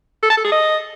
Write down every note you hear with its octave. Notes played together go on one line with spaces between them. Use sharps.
A4
A5
A4
G#4
D#5